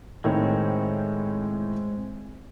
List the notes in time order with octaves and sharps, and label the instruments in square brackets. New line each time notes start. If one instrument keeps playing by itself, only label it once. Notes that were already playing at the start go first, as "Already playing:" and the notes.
[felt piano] A2 D#3 [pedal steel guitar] G#3 C4 C#5